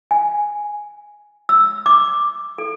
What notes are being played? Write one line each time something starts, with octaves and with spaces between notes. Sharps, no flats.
G#5
E6
D6
A4